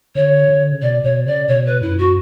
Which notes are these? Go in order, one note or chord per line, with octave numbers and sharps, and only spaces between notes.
D3 C#5
D3
C#3
B2 D5
B2 C#5
C#3 D5
B2 C#5
B4
F#2 E4
F#4